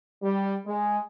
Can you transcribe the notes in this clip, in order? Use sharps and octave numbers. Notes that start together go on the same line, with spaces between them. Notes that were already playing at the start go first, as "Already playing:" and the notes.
G3
G#3